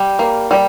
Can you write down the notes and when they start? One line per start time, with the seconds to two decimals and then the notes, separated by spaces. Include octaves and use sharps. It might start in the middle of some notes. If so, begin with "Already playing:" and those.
Already playing: G3
0.19 A#3
0.51 G3